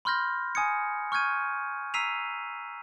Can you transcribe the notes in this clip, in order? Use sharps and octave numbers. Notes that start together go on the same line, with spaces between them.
B5 C6 F6 G6 A#6
G#5 D#6 G#6 C#7
C#6 F6 G6 G#6 D#7
A#5 E6 B6 C7 D#7 F7